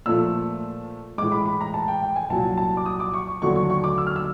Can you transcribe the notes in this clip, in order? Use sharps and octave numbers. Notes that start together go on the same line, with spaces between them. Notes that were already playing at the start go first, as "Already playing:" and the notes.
A#2 F3 A3 E6
A2 E3 G#3 D6
B5
B5
A#5
A5
G5
G5
G#5
C2 A#2 F#3 A5
A5
D6
D#6
D6
C#6
C#6
D#2 D3 F#3 A3 C#6
C#6
C#6
D6
E6
F6
E6